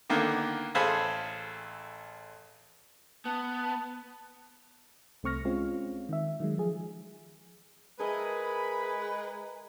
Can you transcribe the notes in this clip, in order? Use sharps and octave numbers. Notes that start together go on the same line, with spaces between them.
D3 D#3 A#3 B3
A1 G#4 A4 C5 F5 B5
B3 A5
C2 A3 C4 C#6 F6 A#6
G#3 C4 C#4 F4
D#3 E5
D#3 F#3 G#3
F3 G#4
G#3 G#4 A#4 B4 D#5 E5 B5